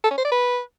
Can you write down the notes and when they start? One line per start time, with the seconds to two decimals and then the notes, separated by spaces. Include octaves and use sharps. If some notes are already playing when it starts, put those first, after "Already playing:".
0.04 A4
0.11 C#4
0.18 C5
0.25 D5
0.32 B4